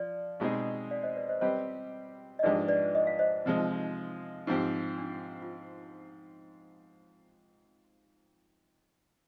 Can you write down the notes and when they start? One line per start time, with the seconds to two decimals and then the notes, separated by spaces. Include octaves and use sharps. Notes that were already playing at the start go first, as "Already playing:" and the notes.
Already playing: F3 D5
0.40 B2 G#3 C4 D#4 G#4
0.91 D5 F5
1.03 C5 D#5
1.16 B4 D5
1.28 C5 D#5
1.41 G3 C4 G4 B4 C5 D#5
2.39 D#5
2.43 G#2 F3 G#3 D4 G4 B4 D5
2.68 B4 D5
2.95 D#5
3.07 F5
3.19 C5 D#5
3.45 C3 F3 G#3 F4
3.58 D#4
3.71 F4
3.83 D#4
4.47 G#2 F3 C4 G4
4.98 D4
5.42 F4